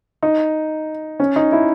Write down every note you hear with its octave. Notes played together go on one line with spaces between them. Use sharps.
D#4
C#4
D#4
E4